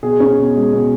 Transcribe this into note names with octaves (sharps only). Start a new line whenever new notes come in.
B2 G#4
C#4
B2
G#3
B2